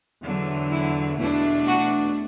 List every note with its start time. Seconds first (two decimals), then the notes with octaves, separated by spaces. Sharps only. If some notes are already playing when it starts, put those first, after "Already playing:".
0.23 E2 D3 F#3
0.71 E4
1.19 E2 B2 A3 D4 E4
1.66 F#4